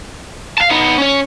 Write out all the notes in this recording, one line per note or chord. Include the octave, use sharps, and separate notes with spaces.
F5 A5
B3 D#4
C#4 C#5